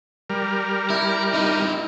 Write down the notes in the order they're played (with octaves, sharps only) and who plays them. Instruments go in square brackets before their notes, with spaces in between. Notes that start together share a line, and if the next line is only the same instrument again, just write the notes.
[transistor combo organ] G3 A#4
[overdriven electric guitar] E4
D#4 E4